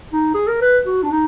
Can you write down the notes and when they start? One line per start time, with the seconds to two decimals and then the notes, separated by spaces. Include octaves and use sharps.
0.13 D#4
0.34 G#4
0.48 A#4
0.62 B4
0.86 F#4
1.03 D4
1.11 D#4